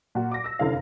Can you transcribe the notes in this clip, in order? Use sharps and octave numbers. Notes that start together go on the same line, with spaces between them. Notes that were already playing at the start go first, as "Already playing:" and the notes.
A#2 F#4
D6 A#6
E6 A#6
F1 F#2 D3 E4 F5